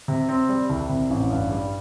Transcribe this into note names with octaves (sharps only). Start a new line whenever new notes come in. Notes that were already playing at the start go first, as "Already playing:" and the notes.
C3
C4
G3
C2
C3
A1
G2
G3